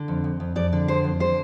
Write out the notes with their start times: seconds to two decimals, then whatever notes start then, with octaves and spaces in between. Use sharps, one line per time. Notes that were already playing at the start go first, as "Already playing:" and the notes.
Already playing: D3
0.08 F2
0.24 F2
0.40 F2
0.56 F2 D5
0.72 D3
0.88 F2 C5
1.04 F2
1.20 D3 C5